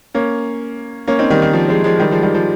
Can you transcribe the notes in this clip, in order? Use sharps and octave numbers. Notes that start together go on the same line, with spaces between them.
A#3 C#4
A#3 C#4
C4 D#4
D#3 G3
D#3
F3
F3 G#3
F3 G#3
D#3 G3
F3 G#3
D#3 G3
F3